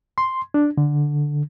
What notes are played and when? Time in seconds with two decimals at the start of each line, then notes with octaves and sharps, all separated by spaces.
0.18 C6
0.54 D4
0.78 D3